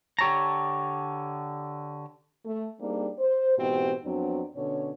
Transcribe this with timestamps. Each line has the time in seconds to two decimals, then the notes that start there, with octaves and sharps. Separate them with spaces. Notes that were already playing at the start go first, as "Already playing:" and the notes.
0.19 D3 G4 C#5 A5 A#5
2.45 A3
2.80 G3 A#3 C4 D4 D#4 G#4
3.19 C5
3.58 G#2 B2 E3 C4 E4 G4
4.04 F2 F#3 B3 C4 D4
4.55 B2 D3 C#4 C#5